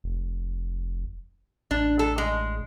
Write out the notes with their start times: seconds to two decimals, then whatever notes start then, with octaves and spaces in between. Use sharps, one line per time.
0.04 F1
1.71 A1 D4
1.99 A4
2.18 G#3